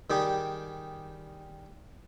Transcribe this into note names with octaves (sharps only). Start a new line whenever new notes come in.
D#3 G3 G4 G#4